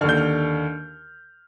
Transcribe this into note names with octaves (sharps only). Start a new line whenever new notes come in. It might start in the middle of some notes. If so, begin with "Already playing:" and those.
D#2 D3 F6
G6
F6